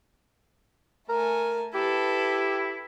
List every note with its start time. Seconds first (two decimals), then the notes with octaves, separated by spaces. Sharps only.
1.09 A3 A#4 G#5
1.74 E4 G4 A4 B4